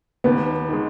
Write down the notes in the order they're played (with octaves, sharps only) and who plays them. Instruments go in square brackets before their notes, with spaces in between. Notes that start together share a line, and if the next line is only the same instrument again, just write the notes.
[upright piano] D#2 [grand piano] B3
[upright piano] D#3 G#3